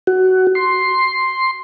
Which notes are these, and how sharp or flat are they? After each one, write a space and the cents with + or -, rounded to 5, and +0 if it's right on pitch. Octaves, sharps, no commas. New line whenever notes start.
F#4 +15
C6 +5